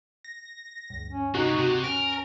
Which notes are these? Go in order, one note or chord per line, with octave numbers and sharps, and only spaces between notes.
A#6
D2 G2
C#4
C3 A#3 D#4 F#4
C3
C#4 A#4 D7